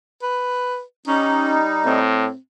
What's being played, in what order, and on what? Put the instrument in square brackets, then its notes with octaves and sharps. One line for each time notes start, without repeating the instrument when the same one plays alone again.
[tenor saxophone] B4
[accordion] G3 D#4 [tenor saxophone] C#4
[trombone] A2 [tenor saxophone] C4